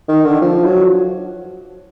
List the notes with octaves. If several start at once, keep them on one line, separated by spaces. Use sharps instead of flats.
D#3
D3
F3
F#3